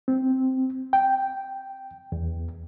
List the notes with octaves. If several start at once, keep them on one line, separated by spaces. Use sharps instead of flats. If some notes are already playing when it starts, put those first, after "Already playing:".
C4
G5
E2